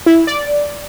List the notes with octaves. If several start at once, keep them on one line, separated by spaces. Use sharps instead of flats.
E4
D5